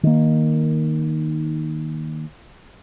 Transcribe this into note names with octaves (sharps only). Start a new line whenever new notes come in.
D#3 A#3